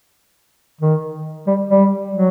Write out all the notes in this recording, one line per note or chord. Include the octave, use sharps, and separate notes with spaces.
D#3
G3
G3
F#3